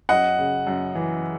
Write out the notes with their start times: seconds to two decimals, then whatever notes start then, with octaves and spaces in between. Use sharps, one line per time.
0.09 F#2 D#5 F#5
0.38 C#3
0.67 F#2
0.95 E3